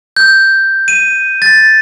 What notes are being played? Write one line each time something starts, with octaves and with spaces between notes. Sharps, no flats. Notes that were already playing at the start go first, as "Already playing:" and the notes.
G6
D#7
A6